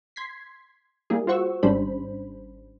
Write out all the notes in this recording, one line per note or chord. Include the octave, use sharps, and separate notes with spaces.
C6 G#6 B6 C7
G3 A#3 E4 G#4
F4 F#4 C5 F#5 C#6 E6
G#1 G3 C#4 D4 C5 B5